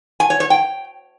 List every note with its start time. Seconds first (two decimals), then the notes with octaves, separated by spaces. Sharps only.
0.20 G#5
0.30 C#5
0.40 C#5
0.50 G5